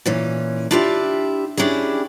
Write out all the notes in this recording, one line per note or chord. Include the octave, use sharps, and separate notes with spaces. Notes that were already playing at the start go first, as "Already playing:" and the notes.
A#2 E3 C#4
D4 E4 F4 G4 D#5 E5
C#4 D4 E4 G4 G#4